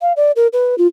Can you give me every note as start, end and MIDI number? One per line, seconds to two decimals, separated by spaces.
0.01 0.13 77
0.16 0.31 74
0.36 0.47 70
0.53 0.75 71
0.78 0.87 65